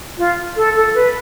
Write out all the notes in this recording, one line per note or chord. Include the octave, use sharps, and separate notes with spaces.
F4
A4
A4
B4